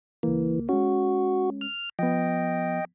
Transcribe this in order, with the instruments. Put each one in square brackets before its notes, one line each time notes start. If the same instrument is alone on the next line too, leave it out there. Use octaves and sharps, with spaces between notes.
[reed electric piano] C#2 A#3 [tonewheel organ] E3
[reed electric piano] G#3 C#4 [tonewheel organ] F#4
[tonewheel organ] F6
[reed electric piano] F3 B3 [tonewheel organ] D#5 G5